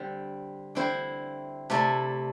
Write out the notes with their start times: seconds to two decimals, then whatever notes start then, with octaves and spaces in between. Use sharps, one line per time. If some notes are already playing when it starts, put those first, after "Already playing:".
Already playing: D3 G3 C4
0.75 D3 C4 E4 C5
1.70 C3 A3 E4 A4 D5